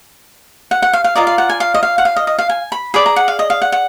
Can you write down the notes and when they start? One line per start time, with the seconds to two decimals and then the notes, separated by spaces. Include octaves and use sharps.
0.71 F#5
0.82 F#5
0.93 F5
1.04 F5
1.15 F4 A#4 D5 D#5
1.27 F5
1.38 F#5
1.49 G#5
1.60 F5
1.74 D#5
1.83 F5
1.98 F#5
2.05 F5
2.16 D#5
2.27 D#5
2.39 F5
2.49 G#5
2.72 B5
2.94 G#4 D5 B5
3.06 A#5
3.16 F#5
3.28 F5
3.39 D#5
3.50 F5
3.62 F#5
3.72 F#5